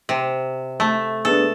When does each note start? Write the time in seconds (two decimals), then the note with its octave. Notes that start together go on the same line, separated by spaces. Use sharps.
0.09 C3
0.80 A3 A5
1.25 G#3 B3 D4 A4